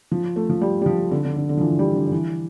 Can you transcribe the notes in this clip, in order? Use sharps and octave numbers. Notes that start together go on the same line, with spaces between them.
F3
A3
F3
G3
G3
F3
D3
D3
D3
D3
F3
E3
G3
D3
D3
E3